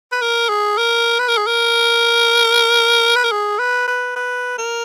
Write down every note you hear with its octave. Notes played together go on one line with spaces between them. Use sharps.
B4
A#4
G#4
A#4
B4
A#4
G#4
A#4
B4
A#4
G#4
B4
B4
B4
A#4